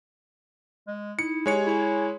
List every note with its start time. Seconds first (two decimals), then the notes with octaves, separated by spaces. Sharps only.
0.87 G#3
1.19 D#4 E4 C#7
1.46 G#3 G4 C#5 D#5 G#5 C#7
1.66 E4 G#4 G#5